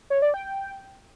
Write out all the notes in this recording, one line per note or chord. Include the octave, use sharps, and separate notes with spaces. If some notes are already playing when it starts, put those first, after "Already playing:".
C#5
D5
G5